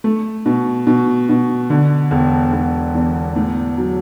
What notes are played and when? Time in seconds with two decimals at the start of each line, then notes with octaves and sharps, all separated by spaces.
0.04 A3
0.46 B2
0.87 B2
1.29 B2
1.70 D3
2.11 E1
2.52 E1
2.95 E2
3.36 A2
3.78 F#3